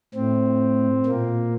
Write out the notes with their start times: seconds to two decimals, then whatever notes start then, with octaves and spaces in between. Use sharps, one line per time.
0.14 A2 C4
1.06 A#2 A#3